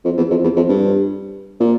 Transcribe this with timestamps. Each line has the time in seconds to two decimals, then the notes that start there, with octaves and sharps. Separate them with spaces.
0.05 F2
0.18 E2
0.31 F2
0.44 E2
0.56 F2
0.69 G2
1.60 A#2